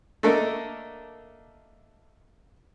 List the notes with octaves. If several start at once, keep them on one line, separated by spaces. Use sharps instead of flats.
A3 A#3 D4 A4 A#4 D#5